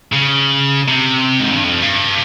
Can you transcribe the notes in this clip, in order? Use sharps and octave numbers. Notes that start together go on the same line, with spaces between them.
C#3
C3
G#2
G2
F2
G2